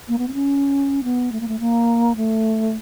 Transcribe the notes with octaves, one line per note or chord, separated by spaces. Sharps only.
A#3
B3
C4
C#4
B3
A3
A#3
A3
A#3
A3